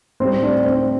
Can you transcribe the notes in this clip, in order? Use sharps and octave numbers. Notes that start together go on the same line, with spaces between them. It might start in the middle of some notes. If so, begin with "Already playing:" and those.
A2 G3 C4 C5
D4 D5
D5
C4 C5